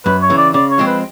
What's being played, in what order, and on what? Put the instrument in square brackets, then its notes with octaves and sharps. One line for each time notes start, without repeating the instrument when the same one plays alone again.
[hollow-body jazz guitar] F#2 [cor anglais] B4
[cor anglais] C#5
[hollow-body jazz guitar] C#3 E3
[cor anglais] D5
[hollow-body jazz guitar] C#3 [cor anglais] D5
[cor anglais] C#5
[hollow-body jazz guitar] F3 G#3 C4
[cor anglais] B4